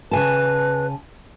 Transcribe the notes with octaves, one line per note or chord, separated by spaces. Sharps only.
C#3 B4 G#5 A5